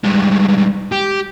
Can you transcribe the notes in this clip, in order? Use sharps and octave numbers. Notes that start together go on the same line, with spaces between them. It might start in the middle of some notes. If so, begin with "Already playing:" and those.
G2 G#3
G4